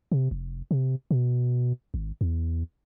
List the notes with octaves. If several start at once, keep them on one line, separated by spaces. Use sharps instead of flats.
C3
F1
C3
B2
G#1
E2